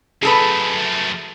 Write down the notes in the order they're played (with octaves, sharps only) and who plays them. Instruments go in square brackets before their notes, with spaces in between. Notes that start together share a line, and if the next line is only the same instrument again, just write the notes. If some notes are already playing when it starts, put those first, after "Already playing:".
[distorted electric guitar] F#2 A3 [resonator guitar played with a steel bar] G#4 A4 B4